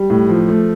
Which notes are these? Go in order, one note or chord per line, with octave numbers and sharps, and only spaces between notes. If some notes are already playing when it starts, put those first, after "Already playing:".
Already playing: G3
A2
F3
A3